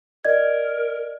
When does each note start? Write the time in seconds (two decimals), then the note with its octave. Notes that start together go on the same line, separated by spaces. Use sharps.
0.25 A#4 D5 D#5 G#6